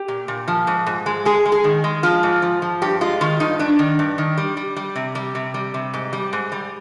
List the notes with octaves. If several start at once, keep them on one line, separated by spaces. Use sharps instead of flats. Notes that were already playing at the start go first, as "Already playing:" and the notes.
Already playing: G4
A#2
A#2
F3
G#2
G#2
G#3
G#3 G#4
G#3
G#4
D#3
G#3
F3 F4
G#2
F3
F3
G2 G4
G#3 F4
D#3 F4
G2 D#4
G2 D4
D#3
G2
D#3
G3
G3
G3
C3
G3
C3
G3
C3
G#2
G3
G#2
G3